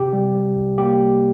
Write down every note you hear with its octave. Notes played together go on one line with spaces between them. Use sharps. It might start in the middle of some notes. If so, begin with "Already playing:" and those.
Already playing: C3 G4
G3
G3
C2
A#3 G4
G3